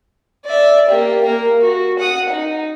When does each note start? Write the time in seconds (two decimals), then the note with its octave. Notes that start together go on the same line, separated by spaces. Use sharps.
0.46 D5 E5
0.89 A#3 G4
1.24 A#3 A#4
1.61 F#4
1.99 F#5 D#6
2.30 D#4